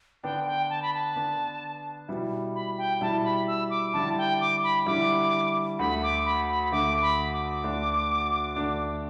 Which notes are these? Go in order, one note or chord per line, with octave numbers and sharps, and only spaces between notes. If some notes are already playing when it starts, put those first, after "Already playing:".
D3 B3 D4 G5
G5
A5
B5
A5
D3 B3 D4
B2 G3 E4
B5
G5
B2 G3 E4 A5
B5
E6
D6
D3 G3 E4 A5
G5
D6
B5
D3 G3 E4 D6
D2 D3 A3 B5
D6
B5
B5
B5
D2 D3 A3 D6
B5
D6
D2 D3 A3 D4
D2 D3 A3 D4